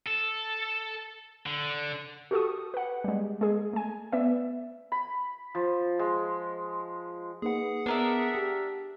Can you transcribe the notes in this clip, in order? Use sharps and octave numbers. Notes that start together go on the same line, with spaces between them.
A4
D3
F#4 G4 A4 C#6 D#6
B4 F#5
G3 G#3
G#3 G#4
A3 G#5
B3 B4 D5 E5
B5
F3
G#3
A#3 D#4 G#4 B4 F#5
B3 D4 A#4 E5
G4